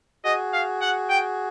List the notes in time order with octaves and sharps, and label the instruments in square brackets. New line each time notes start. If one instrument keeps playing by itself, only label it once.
[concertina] F#4 G#4 [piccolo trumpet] D#5
[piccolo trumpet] F5
F#5
G5